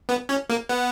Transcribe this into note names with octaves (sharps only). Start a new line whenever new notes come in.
B3
C#4
A#3
B3